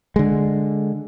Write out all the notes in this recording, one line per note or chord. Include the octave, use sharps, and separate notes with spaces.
D3 G#3